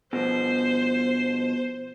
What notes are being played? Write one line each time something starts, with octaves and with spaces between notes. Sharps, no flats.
B2 F3 C5